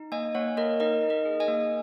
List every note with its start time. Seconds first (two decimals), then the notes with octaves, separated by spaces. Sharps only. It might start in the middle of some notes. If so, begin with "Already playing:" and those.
Already playing: D#4
0.12 A#3 D#5 G#5
0.35 A#3 C#5 F#5
0.57 A#3 A#4 D#5
0.80 D#4 A#4 D#5
1.03 D#4
1.10 A#4 D#5
1.25 G#4
1.40 D#5 G#5
1.48 A#3